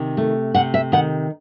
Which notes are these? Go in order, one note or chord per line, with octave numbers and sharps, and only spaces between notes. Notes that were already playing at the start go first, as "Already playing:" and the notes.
Already playing: C3 D#3
A3
C3 F#5
E5
D#3 F#5